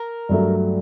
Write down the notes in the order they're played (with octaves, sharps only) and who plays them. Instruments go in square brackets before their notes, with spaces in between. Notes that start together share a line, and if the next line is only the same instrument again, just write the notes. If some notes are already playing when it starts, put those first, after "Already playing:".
Already playing: [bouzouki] A#4
[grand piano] G2 F#3 A3